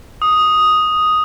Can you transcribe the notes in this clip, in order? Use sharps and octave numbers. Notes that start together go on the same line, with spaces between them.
D#6